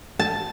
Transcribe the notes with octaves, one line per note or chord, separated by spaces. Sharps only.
A5